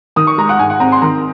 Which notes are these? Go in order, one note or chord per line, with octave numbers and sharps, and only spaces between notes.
D#3 D#6
C#6
G#3 A#5
F#5
G#2 G#5
F#5
C4 A#5
C6
D#3 A#5